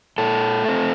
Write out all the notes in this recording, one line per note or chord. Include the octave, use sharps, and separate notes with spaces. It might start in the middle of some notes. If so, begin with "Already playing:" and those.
A#2 A4
A3 C4